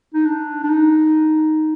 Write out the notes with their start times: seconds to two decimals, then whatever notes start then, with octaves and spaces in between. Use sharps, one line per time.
0.14 D#4
0.26 D4
0.63 D4
0.69 D#4